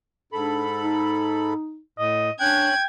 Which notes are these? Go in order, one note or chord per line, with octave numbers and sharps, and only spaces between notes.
G#2 D4 A4 B5
D#4
A2 D#5
C#4 D4 G5 F#6 G#6